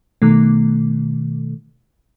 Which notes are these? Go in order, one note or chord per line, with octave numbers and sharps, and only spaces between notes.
B2 D#3 A3